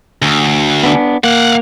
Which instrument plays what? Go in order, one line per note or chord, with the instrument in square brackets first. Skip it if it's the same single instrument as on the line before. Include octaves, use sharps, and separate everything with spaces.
[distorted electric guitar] D2
[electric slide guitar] B3 D4
[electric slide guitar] A#3 [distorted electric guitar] F5 F#5